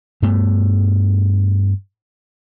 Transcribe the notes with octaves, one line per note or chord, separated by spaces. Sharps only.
G2 A3 B3